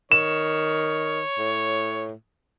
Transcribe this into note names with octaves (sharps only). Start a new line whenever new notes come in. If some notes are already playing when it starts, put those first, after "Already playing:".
D#3 C#5 E7
A2